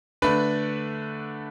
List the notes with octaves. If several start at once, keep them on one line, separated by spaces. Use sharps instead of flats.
D3 A3 D4 B4 B5